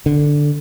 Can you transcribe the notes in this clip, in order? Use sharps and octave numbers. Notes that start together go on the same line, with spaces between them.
D3